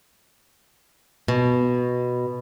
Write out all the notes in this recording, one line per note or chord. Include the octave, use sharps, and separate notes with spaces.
B2